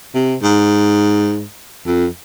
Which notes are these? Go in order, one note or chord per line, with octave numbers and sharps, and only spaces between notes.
C3
G#2
F2